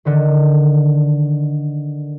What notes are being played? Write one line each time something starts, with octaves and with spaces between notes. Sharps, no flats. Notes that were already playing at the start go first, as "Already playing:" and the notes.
D3 D#3